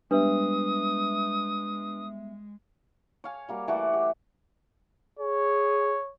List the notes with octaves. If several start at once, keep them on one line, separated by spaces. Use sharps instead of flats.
G3 G#3 B3 D4 B4 E5 D#6
C#5 F5 G#5
G3 A#3 F#4
E3 A3 F#4 D5
G4
G#4 C#5